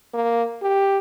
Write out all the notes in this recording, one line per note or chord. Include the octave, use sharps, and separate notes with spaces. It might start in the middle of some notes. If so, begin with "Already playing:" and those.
A#3
G4